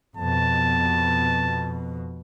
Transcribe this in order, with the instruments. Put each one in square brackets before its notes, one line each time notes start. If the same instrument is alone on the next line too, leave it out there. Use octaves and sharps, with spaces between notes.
[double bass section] F2 B2 [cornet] A5